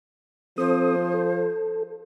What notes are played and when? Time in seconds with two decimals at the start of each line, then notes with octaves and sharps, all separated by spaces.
0.58 F3 C4 A4 C5 D#6
1.14 A4